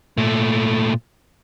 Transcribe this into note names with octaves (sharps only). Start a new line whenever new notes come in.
A#2 A3